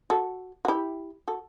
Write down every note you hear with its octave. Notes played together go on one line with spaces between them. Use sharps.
F#4 A4
F#4
E4 G4
F#4 A4